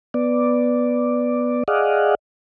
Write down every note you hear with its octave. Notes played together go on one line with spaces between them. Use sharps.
B3 D5
G#4 D5 D#5 F5 F#5